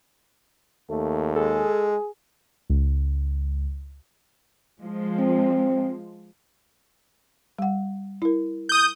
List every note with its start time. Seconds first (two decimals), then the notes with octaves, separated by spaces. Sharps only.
0.89 D#2 A3
1.36 G#3 G#4 A4
2.70 C#2
4.80 F3 G#3
5.19 C4
7.59 G3 F#5
8.22 E4 A#4
8.69 D#6 G6